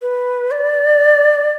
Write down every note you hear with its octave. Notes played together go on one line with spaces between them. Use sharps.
B4
D5